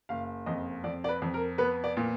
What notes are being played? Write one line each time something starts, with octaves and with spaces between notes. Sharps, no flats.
F#1 F5
F2 D#5
F2 D5
D5
B4
F2
A#4
B3 B4
D5
A#2